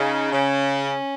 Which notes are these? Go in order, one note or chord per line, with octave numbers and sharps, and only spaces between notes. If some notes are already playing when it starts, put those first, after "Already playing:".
Already playing: C#3 D#4
C#3 C#4